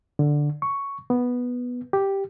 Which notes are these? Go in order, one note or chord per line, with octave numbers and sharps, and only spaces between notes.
D3
C#6
B3
G4